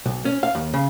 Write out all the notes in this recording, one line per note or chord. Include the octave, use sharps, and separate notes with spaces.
B1
C#4
F5
D#2
C#3